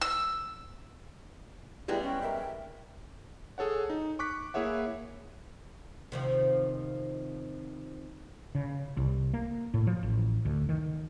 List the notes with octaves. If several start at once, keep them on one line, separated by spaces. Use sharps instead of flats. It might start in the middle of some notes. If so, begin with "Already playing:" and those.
E6
G3 G#3 B3 E4 G4 G#4 D5
C#4 G5
A#4 D#5 E5
G#4 A4 C#5 F#5
D#4
C#6 D6 F#6 B6
A#3 E4 G#4 C#5 E5 F#5
C3 D#3 F3
C#3
C2
A#3
A2
F3
A1
D2
D#3